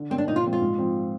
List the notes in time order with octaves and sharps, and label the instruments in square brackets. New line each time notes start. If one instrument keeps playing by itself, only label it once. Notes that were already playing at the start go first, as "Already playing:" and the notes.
Already playing: [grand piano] D3
[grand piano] G3 A#3 [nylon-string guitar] C4
[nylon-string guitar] D4
[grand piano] A#2 [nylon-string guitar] D#4
[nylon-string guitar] F4
[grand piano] F3 G#3 C4
[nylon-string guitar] F4
[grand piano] G#2
F3 C4